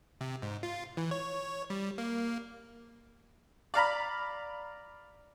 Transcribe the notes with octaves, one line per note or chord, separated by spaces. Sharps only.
C3
G#2
F4
E3
C#5
G3
A#3
D5 F5 A#5 B5